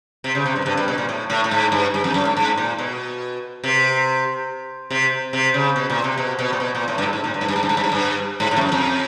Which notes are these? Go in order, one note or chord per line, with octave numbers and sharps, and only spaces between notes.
C3
C#3
C3
G2
G2
G2
B2
A#2
A2
A2
A2
G#2
G2
G2
F2
F#2
G#2
G#2
A#2
B2
C3
C3
C3
C#3
B2
A#2
C3
B2
B2
A#2
B2
A#2
A2
G2
G#2
G#2
A#2
G2
G#2
G2
G#2
G2
G#2
G2
G#2
G2
G#2
A2
F2
F#2
F2